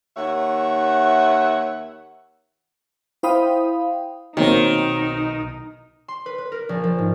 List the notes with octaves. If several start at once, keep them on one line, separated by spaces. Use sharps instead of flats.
D#2 C#5 E5 F#5
E4 C5 F5 G5 B5 D#6
B1 B2 D#3 F#3 A#3 C4 D#4
C6
B4
B4
A#4
A#1
F3
G#2